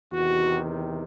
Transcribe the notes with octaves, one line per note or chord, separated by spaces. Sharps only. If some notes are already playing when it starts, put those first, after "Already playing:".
E2 C3 D#3 F#4